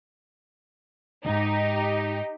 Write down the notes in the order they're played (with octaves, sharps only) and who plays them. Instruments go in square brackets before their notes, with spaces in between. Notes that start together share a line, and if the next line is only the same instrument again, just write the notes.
[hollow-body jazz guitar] D2 G#2 [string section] D#4 G4